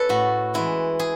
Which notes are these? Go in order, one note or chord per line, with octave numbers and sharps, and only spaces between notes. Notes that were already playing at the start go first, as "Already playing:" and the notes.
Already playing: A4 B4 C#5
A2 F#4
E3 G#3 E4
G#4